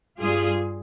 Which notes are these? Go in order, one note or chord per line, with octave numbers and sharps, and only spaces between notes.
G2 G3 F4 G#4